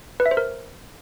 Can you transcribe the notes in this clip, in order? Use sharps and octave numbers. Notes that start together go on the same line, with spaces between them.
B4
E5
C5
A#4